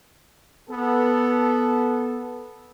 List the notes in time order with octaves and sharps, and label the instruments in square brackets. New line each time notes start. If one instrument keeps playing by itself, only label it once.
[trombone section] B3 A4